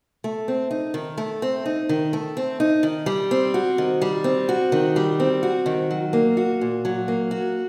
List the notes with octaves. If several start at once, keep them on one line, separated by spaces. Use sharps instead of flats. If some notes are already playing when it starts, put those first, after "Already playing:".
A3
C4
D#4
D#3
A3
C4
D#4
D#3
A3
C4
D#4
D#3
G3
C4
F#4
D#3
G3
C4
F#4
D#3
G3
C4
F#4
D#3
F#3
A#3
F#4
A#2
F#3
A#3
F#4